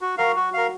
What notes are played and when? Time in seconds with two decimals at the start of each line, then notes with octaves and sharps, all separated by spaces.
0.01 F#4
0.18 F#3 A#4 F5
0.36 F#4
0.54 A#4 F5